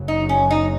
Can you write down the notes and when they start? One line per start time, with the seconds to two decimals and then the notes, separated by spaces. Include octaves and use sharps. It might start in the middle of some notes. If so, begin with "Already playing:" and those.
Already playing: F#1 F#2 C#3 F#3
0.08 D#4
0.29 C#4
0.51 D#4